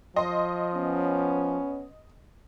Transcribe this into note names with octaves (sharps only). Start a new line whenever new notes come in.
F3 D#5 C6
B3 C#4